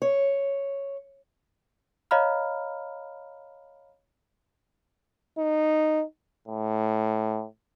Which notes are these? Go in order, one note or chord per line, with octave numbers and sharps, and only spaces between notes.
C#5
C#5 D#5 F5 A#5 B5 F6
D#4
A2